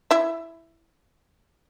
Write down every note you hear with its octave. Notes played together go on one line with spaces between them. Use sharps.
E4 E5